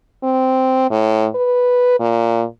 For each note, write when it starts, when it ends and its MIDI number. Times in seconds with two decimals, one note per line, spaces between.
0.23 0.89 60
0.91 1.27 45
1.35 1.98 71
2.00 2.45 46